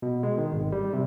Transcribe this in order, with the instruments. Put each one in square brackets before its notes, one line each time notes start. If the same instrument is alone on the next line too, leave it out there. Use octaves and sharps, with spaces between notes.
[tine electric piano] B2
G#3
D#3
G#1
G3
C3